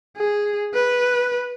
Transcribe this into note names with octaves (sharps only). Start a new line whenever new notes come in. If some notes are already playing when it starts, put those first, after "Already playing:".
G#4
B4